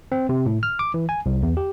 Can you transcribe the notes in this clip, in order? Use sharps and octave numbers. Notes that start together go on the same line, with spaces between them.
C4
C3
A2
F6
D6
E3
G#5
C2
E2
G4